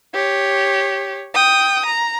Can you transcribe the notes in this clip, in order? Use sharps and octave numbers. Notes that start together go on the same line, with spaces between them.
G4 C#5
G5 D#6
A#5